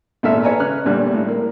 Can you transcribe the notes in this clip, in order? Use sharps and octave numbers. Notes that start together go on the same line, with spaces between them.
A#1 E2 G#2 A4 E5 F6
B4 C#5 G#5 A#5
C#3 F6 F#6
A#1 E2 D3 G3
A2
A#3